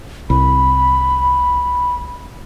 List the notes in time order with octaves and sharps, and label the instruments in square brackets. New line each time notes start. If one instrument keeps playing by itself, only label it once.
[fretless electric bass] C2 [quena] B5